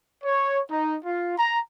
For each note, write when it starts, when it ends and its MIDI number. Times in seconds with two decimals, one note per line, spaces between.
0.24 0.60 73
0.70 0.97 63
1.05 1.36 65
1.37 1.59 82